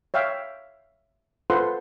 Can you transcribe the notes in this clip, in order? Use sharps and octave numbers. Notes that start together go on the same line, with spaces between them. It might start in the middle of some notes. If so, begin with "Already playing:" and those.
C#5 E5 F5 G5
F4 A4 B4 C5 F#5 C6